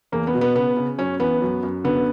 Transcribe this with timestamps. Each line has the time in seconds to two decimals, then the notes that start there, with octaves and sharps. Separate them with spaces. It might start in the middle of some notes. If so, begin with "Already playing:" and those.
0.12 E2 A#3
0.27 B3
0.34 B2
0.41 B3
0.55 C#3 B3
0.77 C#3
0.98 F#2 C#4
1.20 E3 B3
1.41 F#2
1.63 F#2
1.84 D3 B3